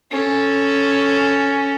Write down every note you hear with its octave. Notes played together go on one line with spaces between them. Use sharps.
C#4 A4